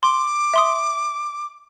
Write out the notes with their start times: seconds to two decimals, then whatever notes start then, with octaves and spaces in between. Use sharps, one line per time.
0.03 C6 D6
0.54 E5 C6 D#6